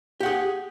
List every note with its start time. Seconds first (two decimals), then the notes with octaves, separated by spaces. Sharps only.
0.20 G4
0.23 F#5
0.26 G#4